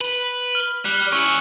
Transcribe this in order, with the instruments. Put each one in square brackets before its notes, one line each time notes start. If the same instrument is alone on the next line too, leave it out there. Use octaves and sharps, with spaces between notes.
[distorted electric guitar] B4
[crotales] F6
[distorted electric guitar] G3 [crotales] F#6
[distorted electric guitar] C#4 E4 [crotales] C#6 E6 C#7